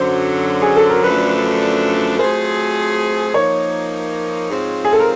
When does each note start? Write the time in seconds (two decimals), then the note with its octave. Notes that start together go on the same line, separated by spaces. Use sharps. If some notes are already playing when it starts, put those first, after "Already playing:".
Already playing: F#2 D3 F#3 C5
0.62 G#4
0.76 A4
0.90 A#4
1.03 F#2 D3 F3 A3 D4 B4
2.19 F#3 A3 C4 F4 G#4 C5
3.34 F3 A#3 D#4 C#5
4.50 G#2 F3 G#3 C4 F4
4.85 G#4
4.93 A4
5.00 A#4